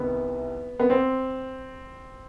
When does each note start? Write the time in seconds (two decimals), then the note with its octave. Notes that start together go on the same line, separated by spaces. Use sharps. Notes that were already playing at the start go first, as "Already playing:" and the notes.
Already playing: C2 C3 D#3 B3
0.80 B3
0.90 C4